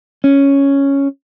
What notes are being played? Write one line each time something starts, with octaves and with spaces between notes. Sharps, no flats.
C#4